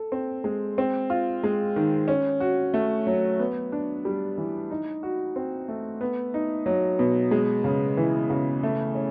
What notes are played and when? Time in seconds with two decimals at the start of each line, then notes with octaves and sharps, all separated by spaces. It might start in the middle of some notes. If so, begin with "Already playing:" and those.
Already playing: A4
0.12 C4
0.44 G#3
0.78 C4
1.10 F4
1.43 G#3
1.76 D#3
2.08 C#4
2.40 F#4
2.74 A3
3.07 F#3
3.39 B3
3.72 D4
4.05 G3
4.38 E3
4.71 D#4
5.03 F#4
5.36 C4
5.68 A3
6.01 B3
6.34 D#4
6.66 F#3
6.99 B2
7.31 G#3
7.64 C#3
7.97 E3
8.30 C#3
8.63 A3
8.95 C#4